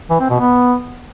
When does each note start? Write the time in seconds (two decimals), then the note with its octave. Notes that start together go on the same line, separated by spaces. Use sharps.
0.10 E3
0.20 C4
0.30 B2
0.40 B3